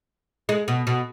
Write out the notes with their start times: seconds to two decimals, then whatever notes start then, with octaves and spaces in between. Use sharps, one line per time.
0.49 G#3
0.68 B2
0.87 B2